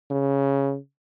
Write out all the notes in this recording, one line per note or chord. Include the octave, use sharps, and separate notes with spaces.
C#3